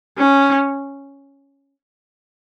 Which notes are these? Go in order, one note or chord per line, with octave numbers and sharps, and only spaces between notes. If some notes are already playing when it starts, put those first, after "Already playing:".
C#4